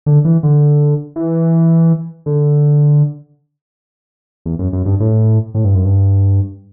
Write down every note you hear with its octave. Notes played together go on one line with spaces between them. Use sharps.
D3
E3
D3
E3
D3
E2
F#2
F#2
G2
A2
A2
G2
F#2
G2